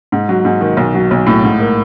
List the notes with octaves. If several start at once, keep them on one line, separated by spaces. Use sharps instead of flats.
G#2
F#3
G#2
D#3
B1
F#3
B1
A2
G#2
A#3